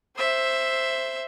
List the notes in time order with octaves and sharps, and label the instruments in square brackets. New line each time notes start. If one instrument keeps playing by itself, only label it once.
[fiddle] C5 E5